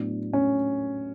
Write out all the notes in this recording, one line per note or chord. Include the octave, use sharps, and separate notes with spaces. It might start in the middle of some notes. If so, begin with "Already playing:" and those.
Already playing: A2 F#3 B3 D4
C#4